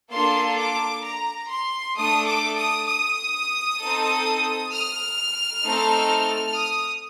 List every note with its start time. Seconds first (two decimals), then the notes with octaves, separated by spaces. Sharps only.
0.12 A#3 D4 F4 A4 C6
0.58 D6
1.04 A#5
1.50 C6
1.96 A3 D4 A4 D#6
2.27 D6
2.58 D#6
2.88 D#6
3.80 C4 D#4 A4
4.72 F6
5.64 A3 C4 D#4 A4
6.56 D#6